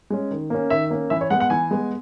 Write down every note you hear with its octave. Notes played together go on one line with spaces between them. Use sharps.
G#3 C#4
D#3
A#3 C#4
D#3 E5
A#3 C#4
E3 E5
C#5
G#3 B3 F#5
F#5
E3 G#5
G#3 B3